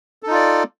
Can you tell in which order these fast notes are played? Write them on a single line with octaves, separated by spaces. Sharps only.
A4 D#4 F4 D5